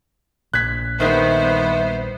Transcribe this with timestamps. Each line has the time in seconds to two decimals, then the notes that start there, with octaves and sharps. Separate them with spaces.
0.54 A#1 F#6 G#6 B6
1.00 D#3 G3 B3 C5 E5